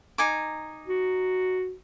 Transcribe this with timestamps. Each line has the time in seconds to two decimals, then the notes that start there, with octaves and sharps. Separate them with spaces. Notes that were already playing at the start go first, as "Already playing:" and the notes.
0.18 D#4 G#5 D6
0.88 F#4